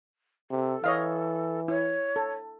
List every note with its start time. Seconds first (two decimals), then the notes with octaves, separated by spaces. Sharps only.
0.51 C3 A4
0.84 E3 C#5 D#5 F5
1.68 E4 C#5
2.16 A4